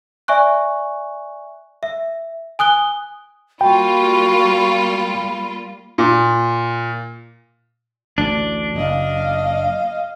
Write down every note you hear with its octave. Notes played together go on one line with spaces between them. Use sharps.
D5 E5 G#5 C#6 F#6
E5
G#5 D#6 F#6 G7
G3 A#3 F4 F#4 G5 B5
A#2
A1 D2 D4
F#1 D#5 F5